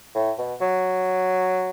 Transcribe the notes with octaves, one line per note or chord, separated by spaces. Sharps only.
A2
B2
F#3